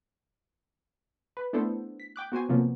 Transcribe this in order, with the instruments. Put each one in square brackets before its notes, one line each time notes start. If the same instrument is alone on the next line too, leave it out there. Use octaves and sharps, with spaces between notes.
[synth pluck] B4
A3 B3 D4 E4 A4 C5
B6
G5 D6 F#6
B3 F#4 C5 G#5
C3 F3 F#3 A#3 B3